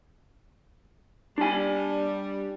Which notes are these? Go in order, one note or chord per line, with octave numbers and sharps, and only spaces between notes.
G3 D4 G#5